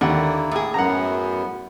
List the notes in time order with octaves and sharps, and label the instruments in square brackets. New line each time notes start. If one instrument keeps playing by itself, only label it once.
[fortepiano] D#2 F#5 [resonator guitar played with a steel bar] D3 [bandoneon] A#3 E4
[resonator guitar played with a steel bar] A2 G#4
[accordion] F#2 [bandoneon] B3 [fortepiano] F#5 A#5